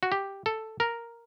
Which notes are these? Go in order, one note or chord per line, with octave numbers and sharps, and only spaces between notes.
F#4
G4
A4
A#4